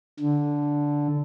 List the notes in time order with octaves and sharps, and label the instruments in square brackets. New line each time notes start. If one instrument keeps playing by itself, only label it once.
[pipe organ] D3